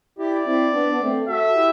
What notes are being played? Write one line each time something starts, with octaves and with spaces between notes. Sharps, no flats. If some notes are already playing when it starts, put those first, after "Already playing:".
E4 G4 D5
C4 E4
B3 D4
B3
A3 C4
F#4 A4 E5
E4 G4